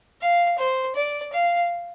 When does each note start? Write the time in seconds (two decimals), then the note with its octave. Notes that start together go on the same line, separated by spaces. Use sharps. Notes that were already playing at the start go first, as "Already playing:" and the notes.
0.22 F5
0.59 C5
0.96 D5
1.33 F5